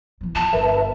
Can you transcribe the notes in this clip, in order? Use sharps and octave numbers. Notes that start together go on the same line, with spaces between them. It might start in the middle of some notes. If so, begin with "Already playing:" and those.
E3 F#3
D#3 F4 A5
G1 A#4 B4 E5